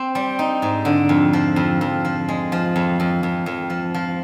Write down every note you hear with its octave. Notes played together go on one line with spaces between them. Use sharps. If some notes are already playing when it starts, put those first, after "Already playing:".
Already playing: C4
G3
D#4
G#2
D3
F2
F3
F2
F2
F3
G#3
F3
F2
F2
F2
F2
F3
F3